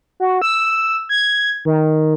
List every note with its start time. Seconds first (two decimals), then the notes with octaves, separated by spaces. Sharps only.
0.20 F#4
0.42 E6
1.09 G#6
1.65 D#3